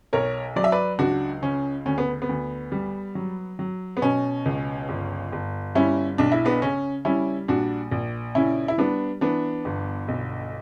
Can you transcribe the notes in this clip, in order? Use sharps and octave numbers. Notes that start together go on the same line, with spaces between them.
B1 A#4 C#5
F#3 D5
E5
B4 D5
C#2 D4 F#4
C#3 C#4
D2 C#4
B3
B3
D2
G3
F#3
F#3
B3
B2 C#4
C#2
G1
G1
G3 C#4 E4
B1 D4
E4
B3 D4
C#3 C#4
G3 C#4 E4
A#1 D4 F#4
A#1
C#3 C#4 E4
E4
G3 B3 D4
E3 B3 D4
G1
B1